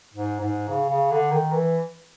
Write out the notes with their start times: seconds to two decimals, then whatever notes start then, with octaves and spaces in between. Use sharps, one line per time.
0.14 G#2
0.41 G#2
0.69 C#3
0.89 C#3
1.11 D3
1.31 D#3
1.52 E3